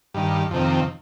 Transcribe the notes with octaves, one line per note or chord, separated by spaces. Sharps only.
G2 D#3
F2 C3 D#3